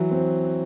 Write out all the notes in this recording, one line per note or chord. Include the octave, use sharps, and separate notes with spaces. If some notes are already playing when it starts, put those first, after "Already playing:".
Already playing: E3 F#3
C4